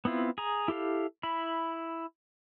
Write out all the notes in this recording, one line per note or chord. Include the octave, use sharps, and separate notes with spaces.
B3 C4 E4 F4
G#4 A#5
E4 G4 A4 F5
E4 B5